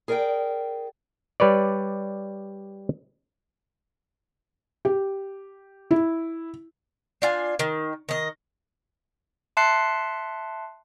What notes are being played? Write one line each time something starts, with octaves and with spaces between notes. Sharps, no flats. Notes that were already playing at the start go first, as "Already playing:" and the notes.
G#4 A#4 D5 F5 G5
G3 B4 C#5 D5
G4
E4
D4 F4 G#5
D#3
D#3 D#5
E5 A5 C6 F#6 C7 C#7